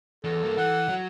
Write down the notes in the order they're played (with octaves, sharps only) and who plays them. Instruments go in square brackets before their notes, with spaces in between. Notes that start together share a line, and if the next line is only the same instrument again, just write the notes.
[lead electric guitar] E2 [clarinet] A4
[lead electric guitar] G2 A#3
[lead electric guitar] E3 [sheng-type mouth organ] F#5
[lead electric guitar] F#3